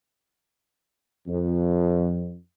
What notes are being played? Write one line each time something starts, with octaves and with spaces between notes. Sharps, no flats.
F2